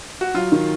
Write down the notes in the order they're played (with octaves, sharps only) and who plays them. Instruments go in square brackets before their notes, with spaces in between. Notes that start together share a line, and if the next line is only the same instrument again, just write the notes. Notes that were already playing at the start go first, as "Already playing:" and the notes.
[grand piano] F#4
[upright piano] F#3 [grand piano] F4
[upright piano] D#3